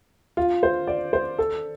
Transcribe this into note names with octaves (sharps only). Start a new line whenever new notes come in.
F4
C5
D5
C5
A4